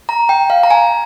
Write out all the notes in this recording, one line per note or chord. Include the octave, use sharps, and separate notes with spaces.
A#5
G5
F5
A#5
G#5